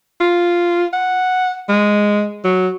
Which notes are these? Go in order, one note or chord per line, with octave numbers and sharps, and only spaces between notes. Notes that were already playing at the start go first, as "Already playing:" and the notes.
F4
F#5
G#3
F#3